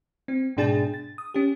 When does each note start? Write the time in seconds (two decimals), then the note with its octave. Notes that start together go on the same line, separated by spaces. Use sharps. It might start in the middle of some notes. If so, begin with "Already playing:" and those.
0.28 C4
0.57 G#2 B2 D4 G#4 G5 A6
0.94 A6
1.18 D#6
1.34 C#4 G4